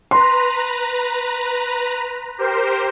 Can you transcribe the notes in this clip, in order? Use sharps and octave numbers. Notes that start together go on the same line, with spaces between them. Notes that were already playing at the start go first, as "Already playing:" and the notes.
B4 A#5 C6
G4 A#4 C5